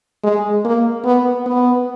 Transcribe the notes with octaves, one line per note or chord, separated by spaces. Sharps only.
G#3
A#3
B3
B3